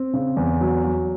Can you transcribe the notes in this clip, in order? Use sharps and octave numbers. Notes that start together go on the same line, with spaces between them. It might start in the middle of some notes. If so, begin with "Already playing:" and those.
Already playing: C4
C#3
E2
F#3
F#3